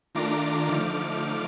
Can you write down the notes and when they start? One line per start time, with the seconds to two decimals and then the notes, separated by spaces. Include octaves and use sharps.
0.15 D#3 A3 D4 F4 A#5 D6
0.69 D3 F3 A3 D#4 D6 F6